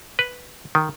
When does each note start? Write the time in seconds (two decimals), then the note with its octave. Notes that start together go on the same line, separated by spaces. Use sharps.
0.19 B4
0.75 D#3